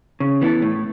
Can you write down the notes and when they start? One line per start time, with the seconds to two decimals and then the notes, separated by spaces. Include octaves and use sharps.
0.20 C#3
0.41 E3 B3 E4 A4
0.62 A2